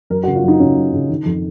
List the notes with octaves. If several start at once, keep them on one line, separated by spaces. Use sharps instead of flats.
F#2 A#4
F#4
C#3
F4
F#2 D#4
C#3 C#4
F#2
C#3
D#3
F2